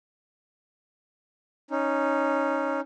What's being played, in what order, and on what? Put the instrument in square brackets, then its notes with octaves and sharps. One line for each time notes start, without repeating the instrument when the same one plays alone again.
[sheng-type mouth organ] C#4 D#4